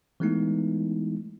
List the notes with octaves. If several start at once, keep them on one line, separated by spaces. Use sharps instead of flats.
E3 G#3 A3 B3 D#4 E4